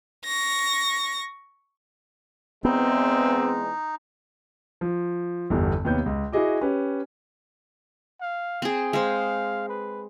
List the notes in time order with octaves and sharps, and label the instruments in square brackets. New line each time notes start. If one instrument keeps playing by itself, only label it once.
[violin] C#6 A#6
[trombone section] E2 G#3 [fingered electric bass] B3 [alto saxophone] C4 [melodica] D#4
[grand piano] F3
G1 E2 G3
D#2 C3 B3 C#5 G6
C#2
E4 F#4 G#4 D#5 D6
C#4 G4 B4
[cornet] F5
[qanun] C4 G#4
[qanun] G#3 C5 [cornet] F5
[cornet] B4